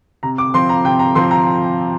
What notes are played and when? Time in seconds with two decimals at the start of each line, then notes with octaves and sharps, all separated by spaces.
0.23 C3 A#5
0.38 D6
0.54 F3 C4 C6
0.69 A#5
0.85 C3 G5
0.99 A#5
1.15 F3 C4 C6
1.31 A#5